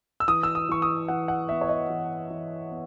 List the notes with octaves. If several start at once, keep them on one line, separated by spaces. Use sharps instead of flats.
E6
E3 D#6
E6
D#6
E3 C#6
D#6
E3 F#5
F#5
B3 E5
C#5
D#5
E3
E3
B3